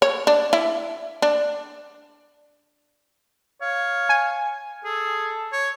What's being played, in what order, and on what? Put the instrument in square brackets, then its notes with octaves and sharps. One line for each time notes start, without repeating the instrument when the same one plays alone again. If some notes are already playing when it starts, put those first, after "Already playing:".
[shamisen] C#5
D4
E4
D4
[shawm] C#5 [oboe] F5
[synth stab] G#5
[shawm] G#4 [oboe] A4
[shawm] C#5